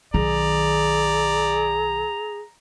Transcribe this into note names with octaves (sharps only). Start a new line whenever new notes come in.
B1 D#3 G#4 D5 A#5